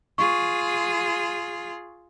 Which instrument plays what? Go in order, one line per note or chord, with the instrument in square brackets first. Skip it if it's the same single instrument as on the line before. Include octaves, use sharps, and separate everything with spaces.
[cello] F4 G#4 [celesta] C#6